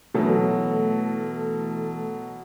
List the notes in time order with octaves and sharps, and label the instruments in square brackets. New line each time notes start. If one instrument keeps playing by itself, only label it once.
[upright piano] B2 F#3 [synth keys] E3 A3 A4